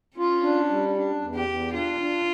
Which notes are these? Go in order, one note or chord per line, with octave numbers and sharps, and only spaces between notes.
C#4 F4
D4
G3
D4
E2
G4
E2
D4 F4
D4